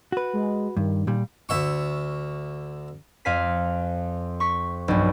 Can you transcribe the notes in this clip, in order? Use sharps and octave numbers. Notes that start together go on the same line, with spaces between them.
F#4 B4
G#3
G2 D#3
A#2 G3
D2 E5 C#6
F2 F5 G#5 B6
C#6 B6
B1 G2